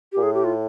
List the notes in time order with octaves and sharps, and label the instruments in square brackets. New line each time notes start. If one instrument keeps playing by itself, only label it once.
[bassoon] A#2 [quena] G4
[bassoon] A2 [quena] G#4
[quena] G4
F4